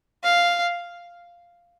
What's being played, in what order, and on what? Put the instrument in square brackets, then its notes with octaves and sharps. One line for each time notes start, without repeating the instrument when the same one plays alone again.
[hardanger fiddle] F5